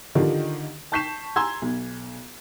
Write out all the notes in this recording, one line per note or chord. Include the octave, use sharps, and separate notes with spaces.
D3 D#3 D4 D#4 F4 G4
A5 C#6 G6 B6 C7 E7
G#5 A#5 C6 E6 G#6
B1